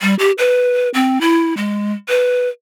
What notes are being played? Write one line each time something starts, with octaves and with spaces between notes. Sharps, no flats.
G3
G4
B4
C4
E4
G#3
B4